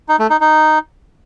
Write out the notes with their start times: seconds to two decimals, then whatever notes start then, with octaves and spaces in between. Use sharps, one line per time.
0.09 D#4
0.19 A3
0.30 D#4
0.41 D#4